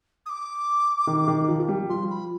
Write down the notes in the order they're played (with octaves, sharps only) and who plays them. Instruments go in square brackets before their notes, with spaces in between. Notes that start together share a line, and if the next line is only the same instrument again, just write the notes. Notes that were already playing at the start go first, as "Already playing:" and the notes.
[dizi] D#6
D6
[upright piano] D#3
D#3
F3
F3
G3
[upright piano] F3 [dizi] C6
[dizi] B5